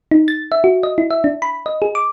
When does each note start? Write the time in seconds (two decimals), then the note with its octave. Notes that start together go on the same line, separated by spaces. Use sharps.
0.11 D#4
0.28 A6
0.52 E5
0.64 F#4
0.83 D#5
0.98 E4
1.11 E5
1.24 D4
1.42 B5
1.66 D#5
1.82 G#4
1.95 D6